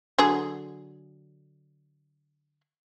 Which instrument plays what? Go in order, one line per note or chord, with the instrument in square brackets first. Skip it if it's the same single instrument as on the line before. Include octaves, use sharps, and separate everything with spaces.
[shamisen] D3 F#3 G#4